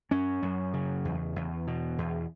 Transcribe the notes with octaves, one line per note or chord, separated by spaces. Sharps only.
F#2 C#4
F#2
C#3
E2
E2
B2
E2